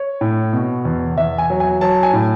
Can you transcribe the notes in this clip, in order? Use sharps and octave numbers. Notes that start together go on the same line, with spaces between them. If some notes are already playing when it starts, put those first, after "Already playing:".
Already playing: C#5
A2
B2
E2
E2 E5
G#5
F#3
G#5
F#3 A5
G#5
A2